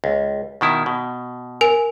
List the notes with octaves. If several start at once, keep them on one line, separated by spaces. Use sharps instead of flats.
C#2
B2 D#3 E4
B2
A#4 G#5 D7